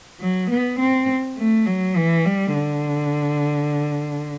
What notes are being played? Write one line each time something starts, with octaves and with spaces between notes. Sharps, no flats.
F#3
B3
C4
A3
F#3
E3
G3
D3